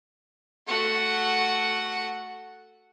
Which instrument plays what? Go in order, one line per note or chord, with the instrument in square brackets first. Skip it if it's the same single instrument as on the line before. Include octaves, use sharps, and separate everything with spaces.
[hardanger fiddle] A3 F#5 [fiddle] F#4